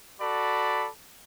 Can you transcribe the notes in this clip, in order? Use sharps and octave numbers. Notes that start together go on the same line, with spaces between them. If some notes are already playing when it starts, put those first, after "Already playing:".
F#4 A4 D5 B5